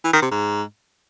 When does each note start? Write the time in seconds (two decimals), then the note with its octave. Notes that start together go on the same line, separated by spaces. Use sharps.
0.05 E3
0.13 D#3
0.22 C3
0.31 G#2